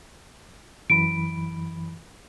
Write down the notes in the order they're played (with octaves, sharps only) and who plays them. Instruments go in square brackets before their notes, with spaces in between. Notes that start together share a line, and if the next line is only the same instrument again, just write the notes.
[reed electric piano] F#2 E3 B5 [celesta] D7